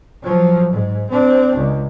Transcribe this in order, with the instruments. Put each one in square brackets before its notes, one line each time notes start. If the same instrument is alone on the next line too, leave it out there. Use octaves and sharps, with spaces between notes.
[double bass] F3 F#3
G#2
C4 D4
C#2